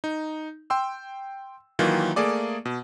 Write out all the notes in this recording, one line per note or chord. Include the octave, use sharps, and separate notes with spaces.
D#4
G5 C6 E6
D#3 E3 F#3 A#3 F4
A3 A#3 G#4 D5 D6
B2